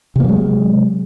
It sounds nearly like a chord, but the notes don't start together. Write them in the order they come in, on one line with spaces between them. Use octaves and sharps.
C3 A#3 F#3 G#3